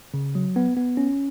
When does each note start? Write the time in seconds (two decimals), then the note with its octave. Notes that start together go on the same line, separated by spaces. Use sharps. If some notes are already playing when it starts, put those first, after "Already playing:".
0.14 C#3
0.35 F#3
0.56 B3
0.77 B3
0.97 C#4